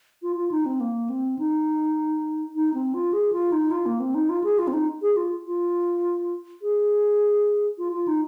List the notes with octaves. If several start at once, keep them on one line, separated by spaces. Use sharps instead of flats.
F4
F4
D#4
C4
A#3
C4
D#4
D#4
C4
F4
G#4
F4
D#4
F4
A#3
C4
D#4
F4
G#4
F4
C4
D#4
G#4
F4
F4
G#4
F4
F4
D#4